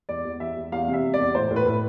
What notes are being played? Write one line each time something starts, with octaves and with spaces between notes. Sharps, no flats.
E2 D5
E2
E2 E5
E2
E2 F5
C3
E5
C3
D5
E2
A2 C5
A2
B4
A2